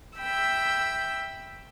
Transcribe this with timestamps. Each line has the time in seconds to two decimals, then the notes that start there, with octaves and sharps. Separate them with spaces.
0.18 E5 G5 B5 E6